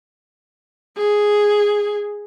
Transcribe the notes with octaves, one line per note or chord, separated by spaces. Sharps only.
G#4